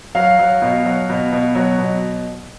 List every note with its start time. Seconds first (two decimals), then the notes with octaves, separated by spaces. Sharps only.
0.15 F#3 F5
0.39 F#3
0.62 B2
0.85 F#3
1.09 B2
1.32 B2
1.55 F#3
1.79 B2